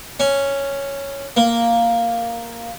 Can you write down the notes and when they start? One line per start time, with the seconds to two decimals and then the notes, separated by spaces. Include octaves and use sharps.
0.20 C#4
1.37 A#3